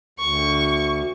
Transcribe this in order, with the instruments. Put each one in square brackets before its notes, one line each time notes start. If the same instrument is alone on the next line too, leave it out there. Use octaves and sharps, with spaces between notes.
[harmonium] D2 [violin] C#6